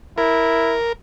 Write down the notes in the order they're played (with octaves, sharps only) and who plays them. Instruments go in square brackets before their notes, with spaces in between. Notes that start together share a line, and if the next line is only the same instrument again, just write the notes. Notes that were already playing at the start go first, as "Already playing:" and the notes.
[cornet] E4 [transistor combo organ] A#4